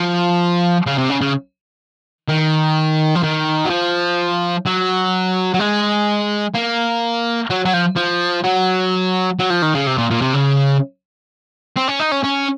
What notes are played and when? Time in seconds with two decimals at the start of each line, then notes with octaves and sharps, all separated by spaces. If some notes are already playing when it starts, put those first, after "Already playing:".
Already playing: F3
0.86 C#3
0.98 C3
1.09 C#3
1.21 C#3
2.28 D#3
3.15 F3
3.23 D#3
3.65 F#3
3.70 F3
4.66 F#3
5.54 F#3
5.60 G#3
6.55 A#3
7.50 F#3
7.65 F#3
7.73 F3
7.96 F3
8.44 F#3
9.39 F#3
9.50 F3
9.62 D#3
9.74 C#3
9.87 C3
9.98 A#2
10.10 A#2
10.22 C3
10.34 C#3
11.76 C4
11.88 C#4
11.99 D#4
12.12 C#4
12.24 C#4